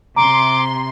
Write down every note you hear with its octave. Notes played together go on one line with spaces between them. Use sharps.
C3 A#5 C6 D6